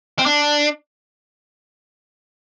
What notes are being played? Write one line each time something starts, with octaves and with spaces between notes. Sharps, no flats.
C4
D4